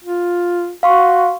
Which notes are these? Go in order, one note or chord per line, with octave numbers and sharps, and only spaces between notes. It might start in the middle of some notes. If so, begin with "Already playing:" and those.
F4
F#4 F5 C6 C#6